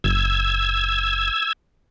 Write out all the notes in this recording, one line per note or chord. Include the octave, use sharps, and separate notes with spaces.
F#1 E6 G#6